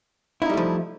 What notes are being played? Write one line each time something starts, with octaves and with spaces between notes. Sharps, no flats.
F3 G3 A3 D#4 E4